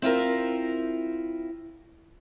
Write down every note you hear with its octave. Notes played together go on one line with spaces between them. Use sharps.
C4 E4 F4 A#4